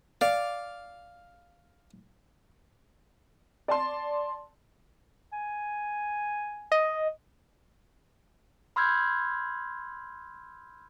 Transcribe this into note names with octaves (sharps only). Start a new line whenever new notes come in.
D5 F5
D5 A5 C6
G#5
D#5
B5 C6 E6 F6 G6 G#6